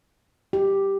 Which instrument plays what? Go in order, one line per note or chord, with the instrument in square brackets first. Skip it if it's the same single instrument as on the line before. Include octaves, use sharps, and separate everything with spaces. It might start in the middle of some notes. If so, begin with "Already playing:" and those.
[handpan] G4